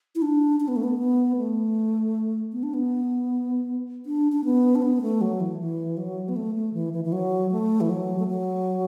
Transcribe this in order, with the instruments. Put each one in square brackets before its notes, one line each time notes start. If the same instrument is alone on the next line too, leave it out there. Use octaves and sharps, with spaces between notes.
[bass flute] E4
D4
D4
B3
A3
B3
B3
A3
B3
D4
B3
D4
D4
B3
D4
B3
A3
F#3
E3
E3
F#3
B3
A3
A3
E3
E3
E3
F#3
A3
E3
F#3
A3
F#3